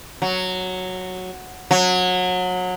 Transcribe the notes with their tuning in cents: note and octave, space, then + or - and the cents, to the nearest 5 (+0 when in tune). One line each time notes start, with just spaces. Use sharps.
F#3 -5
F#3 -25